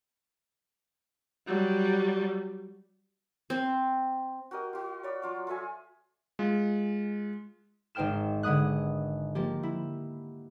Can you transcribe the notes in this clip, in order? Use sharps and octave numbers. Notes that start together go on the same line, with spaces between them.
F#3 G3
C4
F#4 G4 A#4 D#5
F4 F#4
C#5 D5 B5
F#3 F4 D6
F4 A4 E5 G#5
G#3 F4
G#1 D#4 C5 G5 F6 E7
D3 G#3 B3 D#6 F#6
F3 A#3 G4
E4